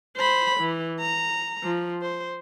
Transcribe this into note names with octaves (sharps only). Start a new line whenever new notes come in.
C5 B5
E3
A#5
F3
C5